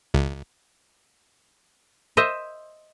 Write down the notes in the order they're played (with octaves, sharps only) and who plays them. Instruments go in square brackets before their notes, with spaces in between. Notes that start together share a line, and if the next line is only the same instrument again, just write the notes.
[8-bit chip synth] C#2
[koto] C5 D#5 E5